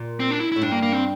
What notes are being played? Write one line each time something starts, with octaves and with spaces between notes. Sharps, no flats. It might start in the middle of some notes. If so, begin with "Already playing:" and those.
Already playing: A#2
C4
D4
E4
A2 E4
G2 D4
A#3
A#3
C4